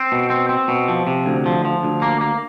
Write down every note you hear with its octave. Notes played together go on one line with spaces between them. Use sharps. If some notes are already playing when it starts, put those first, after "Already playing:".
Already playing: C4
B2
C4
C4
B2
F3
C3
D2
F3
F3
D2
A#3
A#3